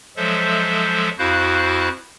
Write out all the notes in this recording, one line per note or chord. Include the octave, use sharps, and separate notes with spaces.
F3 F#3 G#3 A4 C5 E5
F2 E4 F#4 C5 F5 F#6